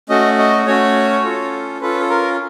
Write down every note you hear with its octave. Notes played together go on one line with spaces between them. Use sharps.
A3 C#4 F#4 D#5
D#5
A3 C#4 F#4 C#5
C#4 F4 A4
C#4 F4 A4 B4
A4
A#4